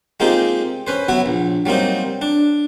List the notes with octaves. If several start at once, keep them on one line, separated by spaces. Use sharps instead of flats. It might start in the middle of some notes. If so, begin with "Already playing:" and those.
G#3 A#3 C4 D#4 F4 G4
C#4 B4 C5
F#3 B3 E4 F#4
A#1
F#3 G3 A#3 C4 D#4
D4